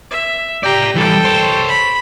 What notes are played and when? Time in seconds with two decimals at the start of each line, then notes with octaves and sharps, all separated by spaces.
0.11 E5
0.63 G4 D5 G5 A#5
0.96 E3 G3 A4 G5
1.25 C5 C#5
1.68 B5